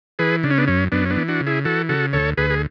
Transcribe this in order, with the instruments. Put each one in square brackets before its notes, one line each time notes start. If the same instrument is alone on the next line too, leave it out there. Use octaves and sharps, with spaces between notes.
[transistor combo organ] E3 G#4 B4
C#3 D4
C#4
B3 D4
F#2 C#4
F#2 B3 D4
C#4
B3 D4
E3
D4 F#4
C#3
E4 G#4
E3 F#4 A4
C#3 F#4 A4
D2 A4 C#5
D2 G#4 B4
G#4